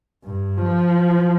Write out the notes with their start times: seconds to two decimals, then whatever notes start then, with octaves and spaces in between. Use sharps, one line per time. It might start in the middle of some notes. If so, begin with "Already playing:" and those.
0.25 G2
0.57 F3